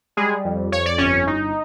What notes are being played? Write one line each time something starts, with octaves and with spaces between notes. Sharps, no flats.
G3 G#3 G#4
F2
F2 C#5
D5
G1 C#4 C#5
D#4